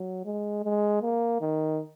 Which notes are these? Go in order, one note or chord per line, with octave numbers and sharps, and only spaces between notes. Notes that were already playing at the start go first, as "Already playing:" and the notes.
Already playing: F#3
G#3
G#3
A#3
D#3